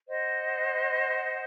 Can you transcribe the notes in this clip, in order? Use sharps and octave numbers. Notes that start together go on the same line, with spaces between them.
C5 D#5 F#5